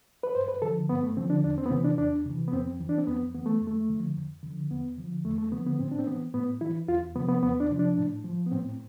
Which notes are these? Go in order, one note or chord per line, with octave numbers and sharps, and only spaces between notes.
B4
G2 C5
B4
D3 F3 A4
G2 B3
A3
D3 F3 C4
D4
E2 D4
C4
B3
C3 E3 C4
D4
E2 D4
C3 E3
B3
F2 C4
E3
D4
C4
F2 B3
E3 B3
A3
F2
A3
D3 F3
F2
D3 F3
E2 B3
D3 F3
E2 A3
A3
D3 F3 B3
B3
A2 C4
D4
C4
E3 B3
A2 B3
E3 E4
E2 F4
C3 F3 B3
B3
E2 B3
D4
C3 F3
D4
A2
F3
B3
A2 C4